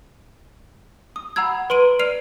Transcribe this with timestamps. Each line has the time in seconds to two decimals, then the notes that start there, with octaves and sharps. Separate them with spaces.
1.16 D#6
1.36 F#5 A#5 B5 E6 G#6
1.70 B4 C6 D7 D#7
1.99 D5 F6 C7 D7 D#7 F7